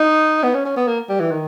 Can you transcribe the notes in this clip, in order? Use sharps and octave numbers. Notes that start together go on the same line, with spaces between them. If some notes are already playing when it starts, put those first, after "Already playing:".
Already playing: D#4
B3
C#4
C#4
B3
A#3
G3
E3
D#3